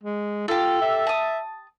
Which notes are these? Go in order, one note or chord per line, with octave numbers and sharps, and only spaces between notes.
G#3
F4 G4 A4
E5
A5 D#6